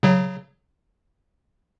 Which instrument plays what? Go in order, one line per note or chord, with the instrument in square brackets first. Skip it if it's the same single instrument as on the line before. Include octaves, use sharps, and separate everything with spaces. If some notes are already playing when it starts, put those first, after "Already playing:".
[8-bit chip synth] C#3 F#3